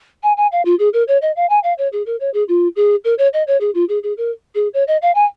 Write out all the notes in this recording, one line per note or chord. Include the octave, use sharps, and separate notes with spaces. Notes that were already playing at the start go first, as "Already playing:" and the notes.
G#5
G#5
F5
F4
G#4
A#4
C#5
D#5
F5
G#5
F5
C#5
G#4
A#4
C#5
G#4
F4
G#4
A#4
C#5
D#5
C#5
G#4
F4
G#4
G#4
A#4
G#4
C#5
D#5
F5
G#5